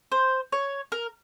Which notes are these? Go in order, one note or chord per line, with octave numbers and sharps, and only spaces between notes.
C5
C#5
A#4